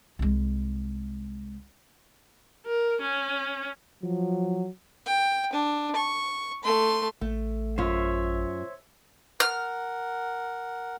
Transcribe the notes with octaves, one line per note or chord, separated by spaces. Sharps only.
C2 G#3
A#4
C#4
F3 F#3
G5
D4
C#6
A3 C6
A1 A3
F#2 F4 C5 C#5 E5
A#4 F#5 F6